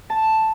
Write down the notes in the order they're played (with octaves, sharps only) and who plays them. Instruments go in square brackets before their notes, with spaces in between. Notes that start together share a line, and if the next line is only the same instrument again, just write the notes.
[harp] A5